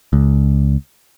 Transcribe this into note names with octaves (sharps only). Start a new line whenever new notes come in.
C#2